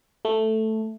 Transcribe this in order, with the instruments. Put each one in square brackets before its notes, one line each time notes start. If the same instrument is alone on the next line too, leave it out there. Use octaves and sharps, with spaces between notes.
[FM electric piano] A3